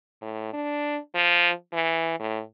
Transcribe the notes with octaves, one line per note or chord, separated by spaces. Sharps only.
A2
D4
F3
E3
A2